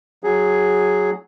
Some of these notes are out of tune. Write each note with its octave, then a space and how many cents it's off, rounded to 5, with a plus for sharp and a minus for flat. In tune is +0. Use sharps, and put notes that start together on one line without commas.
F#3 +0 G#4 +0